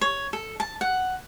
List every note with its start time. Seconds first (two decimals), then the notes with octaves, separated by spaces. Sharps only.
0.01 C#5
0.33 A4
0.60 A5
0.81 F#5